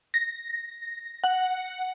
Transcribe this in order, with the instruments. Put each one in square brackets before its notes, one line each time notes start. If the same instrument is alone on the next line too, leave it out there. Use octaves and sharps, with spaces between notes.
[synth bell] A#6
F#5